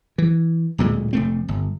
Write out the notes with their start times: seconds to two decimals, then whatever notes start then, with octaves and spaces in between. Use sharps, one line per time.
0.18 E3
0.78 D1 D2 A#2 G#3
1.13 F1 A3 C4
1.48 G1